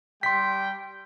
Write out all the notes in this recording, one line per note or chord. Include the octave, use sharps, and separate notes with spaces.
G3 G5 C6 B6